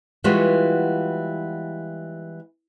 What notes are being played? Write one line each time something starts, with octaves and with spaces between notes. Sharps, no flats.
E3 G3 G#3 B3 F4 F#4